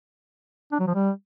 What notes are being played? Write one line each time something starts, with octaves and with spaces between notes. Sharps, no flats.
D4
F#3
F3
G3